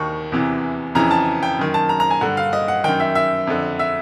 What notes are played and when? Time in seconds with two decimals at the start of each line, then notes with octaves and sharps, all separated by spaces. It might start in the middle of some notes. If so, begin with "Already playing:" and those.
Already playing: D#2 D#3 C#6
0.32 E2 C3 E3
0.95 F2 C#3 E3 A#5
1.11 A5
1.43 G5
1.59 F#2 D#3
1.74 A5
1.89 A#5
2.00 A#5
2.11 G#5
2.21 G2 D3 F#5
2.37 F5
2.53 D#5
2.68 F#5
2.84 F#2 D#3 G5
3.00 E5
3.15 E5
3.47 F2 D3
3.79 E5